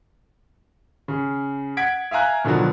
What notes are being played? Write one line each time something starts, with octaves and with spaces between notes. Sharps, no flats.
C#3
F#5 G#6 B6 D7
E5 F5 G#5 A#5 F#6
B2 D3 D#3 F3 F#3